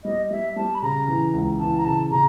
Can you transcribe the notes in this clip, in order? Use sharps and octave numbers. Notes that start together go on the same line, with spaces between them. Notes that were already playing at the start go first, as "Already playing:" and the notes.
G3 D#5
G3 E5
G3 A5
B5
C#3 A#5
E3
C#2
E3 A5
A#5
C#3 A5
C#3 A#5